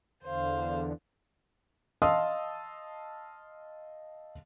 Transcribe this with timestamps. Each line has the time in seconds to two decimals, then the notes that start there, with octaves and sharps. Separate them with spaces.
0.24 E2 D3 C5 F5
2.02 D#5 F5 A5 C6 D#6 E6